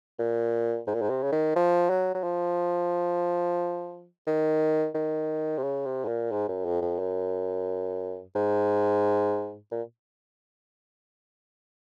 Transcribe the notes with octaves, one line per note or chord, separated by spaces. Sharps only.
A#2
G#2
A#2
G#2
C3
C#3
D#3
F3
F#3
F#3
F3
D#3
D#3
C3
C#3
C3
G#2
A#2
G#2
F#2
F2
F2
F#2
G#2
A#2